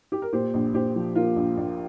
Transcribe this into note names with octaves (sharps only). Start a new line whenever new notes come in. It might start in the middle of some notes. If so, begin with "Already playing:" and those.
G4
A#4
A#2 G4 C5
A#1
A#1 G4 C5
F3
A#2 F4 A#4
A#1
A#1